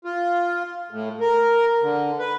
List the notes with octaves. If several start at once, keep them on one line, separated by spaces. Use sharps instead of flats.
F4
A2
A#4
D3
B4